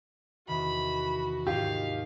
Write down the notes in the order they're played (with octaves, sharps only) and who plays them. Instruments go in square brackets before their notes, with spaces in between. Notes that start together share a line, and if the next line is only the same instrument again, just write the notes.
[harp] E2 C3 D#3 [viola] F#4 [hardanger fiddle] B5
[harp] D#2 G#2 [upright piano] F4 G4 [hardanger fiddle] F5